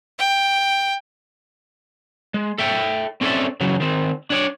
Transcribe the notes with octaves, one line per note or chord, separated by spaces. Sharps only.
G5
G#3
A4 E5 G5
C4 C#4 A4 A#4 D5 E5
C#3 E3 F#3
D#3 C4
D4 C#5 D5